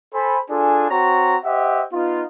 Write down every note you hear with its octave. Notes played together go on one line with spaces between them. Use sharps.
A4 C5 G#5 B5
D4 F4 G#4 A4 G#5
C4 F#4 C#5 A#5
G4 C5 D#5 E5 F#5
B3 D#4 F4